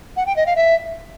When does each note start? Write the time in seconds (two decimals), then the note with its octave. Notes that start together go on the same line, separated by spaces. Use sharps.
0.17 F#5
0.26 G5
0.36 D#5
0.46 F5
0.56 E5